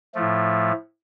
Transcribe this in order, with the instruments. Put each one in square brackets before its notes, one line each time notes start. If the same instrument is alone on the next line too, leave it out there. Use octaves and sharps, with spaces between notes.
[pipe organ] A2 F3 A3